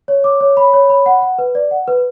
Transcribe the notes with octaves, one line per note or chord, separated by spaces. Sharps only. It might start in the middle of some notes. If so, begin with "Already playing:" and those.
C#5
D6
C#5
B5
C#5
B5
F#5
F#5
B4
D5
F#5
B4